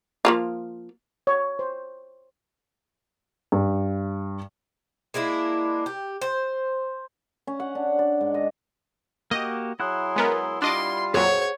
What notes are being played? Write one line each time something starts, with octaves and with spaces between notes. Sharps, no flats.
F3 A#3 F4
C#5
C5
G2
G#3 A#3 D4 E4
G4
C5
C#4
F#5
D4
D5
G#2
D#5
A#3 F#4 G4 D#5
F#3 E4 G#4 F#5 C6 F#6
G#3 B3 A#4
G3 D4 F4 D#5 C6 D6
F2 A#2 F#3 G#4 C5 C#5 F#5